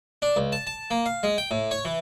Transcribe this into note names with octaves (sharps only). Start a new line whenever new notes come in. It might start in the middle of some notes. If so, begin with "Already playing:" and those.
D4
C#2
A5
A5
A#3
F5
G#3
G5
A2
C#5
E3